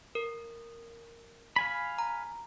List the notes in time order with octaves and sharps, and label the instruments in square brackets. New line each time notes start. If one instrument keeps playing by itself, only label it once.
[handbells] A#4
[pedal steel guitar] F5 G#5 B5
[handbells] A#5